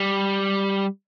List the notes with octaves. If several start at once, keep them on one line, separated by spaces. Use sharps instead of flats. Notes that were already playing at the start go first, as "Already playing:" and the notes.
Already playing: G3